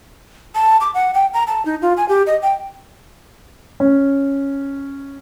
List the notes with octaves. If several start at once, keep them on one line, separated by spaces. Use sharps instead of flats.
A5
D6
F#5
G5
A#5
A5
D#4
F4
G#5
G4
D#5
G5
C#4